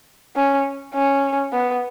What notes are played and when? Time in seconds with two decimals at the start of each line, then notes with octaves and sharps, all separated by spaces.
0.36 C#4
0.94 C#4
1.53 B3